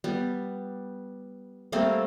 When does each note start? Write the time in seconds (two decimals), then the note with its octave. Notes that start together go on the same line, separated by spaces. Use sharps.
0.04 G3 B3
1.72 G3 A3 A#3 C4